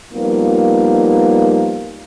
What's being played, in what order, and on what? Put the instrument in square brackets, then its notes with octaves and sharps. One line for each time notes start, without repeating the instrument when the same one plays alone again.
[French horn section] F3 G3 A#3 B3 D#4 F4